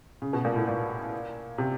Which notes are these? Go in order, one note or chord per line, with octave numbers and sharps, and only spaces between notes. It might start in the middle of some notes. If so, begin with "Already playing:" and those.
C#3
B2
A#2
A2
A#2
C3